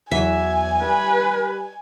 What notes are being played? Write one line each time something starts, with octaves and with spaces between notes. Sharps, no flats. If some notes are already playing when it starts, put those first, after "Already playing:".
E2 E3 F#3 E5 G#5
G3 B4